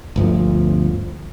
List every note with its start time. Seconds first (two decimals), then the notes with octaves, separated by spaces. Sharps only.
0.16 G1 D2 F3